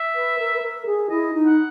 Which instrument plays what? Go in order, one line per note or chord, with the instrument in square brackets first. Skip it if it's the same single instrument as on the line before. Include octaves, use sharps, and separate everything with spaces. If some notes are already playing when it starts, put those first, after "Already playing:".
Already playing: [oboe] E5
[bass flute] B4
A#4
B4
A#4
G#4
[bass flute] E4 [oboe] D#5
[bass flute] D#4
[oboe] F#5